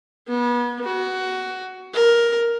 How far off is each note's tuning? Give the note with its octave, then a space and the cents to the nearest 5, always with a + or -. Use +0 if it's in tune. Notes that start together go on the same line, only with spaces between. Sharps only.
B3 -35
F#4 +15
A#4 +10